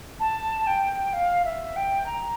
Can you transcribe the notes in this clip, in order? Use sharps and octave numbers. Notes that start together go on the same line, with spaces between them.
A5
G5
F5
E5
G5
A#5